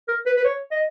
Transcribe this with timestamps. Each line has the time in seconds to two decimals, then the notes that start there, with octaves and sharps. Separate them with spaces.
0.08 A#4
0.26 B4
0.36 B4
0.44 C#5
0.71 D#5